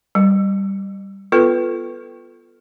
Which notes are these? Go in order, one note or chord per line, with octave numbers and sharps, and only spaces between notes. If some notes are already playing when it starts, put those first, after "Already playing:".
G3
B3 F4 A4 B4